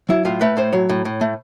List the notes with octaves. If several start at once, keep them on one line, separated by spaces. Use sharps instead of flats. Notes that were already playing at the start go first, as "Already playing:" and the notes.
F#3 E4
A2 F4
A3 B4
A2 C5
F#3 C#5
A2
A2
A3